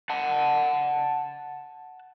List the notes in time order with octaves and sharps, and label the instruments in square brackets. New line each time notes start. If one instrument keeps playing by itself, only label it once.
[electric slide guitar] F#5 A5